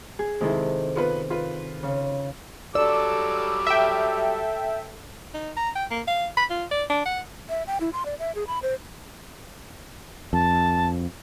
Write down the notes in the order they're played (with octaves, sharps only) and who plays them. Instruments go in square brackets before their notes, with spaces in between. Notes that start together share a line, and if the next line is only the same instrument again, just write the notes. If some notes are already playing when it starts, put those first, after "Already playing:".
[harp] G#4
[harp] C3 D#3 A4 [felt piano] G#3 E4
[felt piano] B3 F4 B4
F4 B4
[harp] C#3
[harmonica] F#3 G3 D6 [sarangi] A4 [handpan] D5 [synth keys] E6
[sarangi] A4 [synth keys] E5 G5
[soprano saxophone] D#4
A#5
G5
A#3
F5
B5
F4
D5
D4
F#5
[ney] E5
G5
E4
C6
D5
E5
G#4
B5
C5
[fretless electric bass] F2 [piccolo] A5